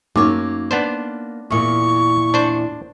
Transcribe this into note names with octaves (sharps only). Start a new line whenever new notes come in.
F#2 A#3 D#4 C#5 C6 D6
B3 D4 C5
E2 A#2 C#6
D4 C5